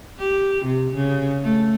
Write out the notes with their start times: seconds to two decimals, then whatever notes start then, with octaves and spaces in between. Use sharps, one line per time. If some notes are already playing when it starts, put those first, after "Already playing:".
0.19 G4
0.65 C3
0.95 C#3
1.43 A3